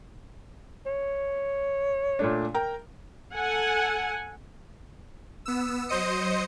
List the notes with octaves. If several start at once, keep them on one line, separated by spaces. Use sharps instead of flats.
C#5
A#2 A3 D4
A#4 G5 A#5
A4 F#5 G#5
B3 E6
F#3 C5 D#5 D#6 C#7